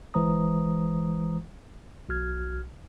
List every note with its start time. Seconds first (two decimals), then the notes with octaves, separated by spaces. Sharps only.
0.14 G1 E3 G#3 C5 A#5 D#6
2.09 B1 F#4 F6 G#6